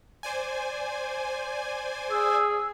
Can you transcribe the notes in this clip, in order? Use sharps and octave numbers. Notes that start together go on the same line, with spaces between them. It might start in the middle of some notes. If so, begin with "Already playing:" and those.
C5 D5 G#5
G#4 E6